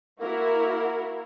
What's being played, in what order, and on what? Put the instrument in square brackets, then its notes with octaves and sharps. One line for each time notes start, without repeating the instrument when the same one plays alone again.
[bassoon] A#3 [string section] E4 F#4 A#4